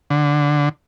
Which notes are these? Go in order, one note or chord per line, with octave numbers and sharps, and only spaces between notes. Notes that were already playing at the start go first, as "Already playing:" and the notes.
D3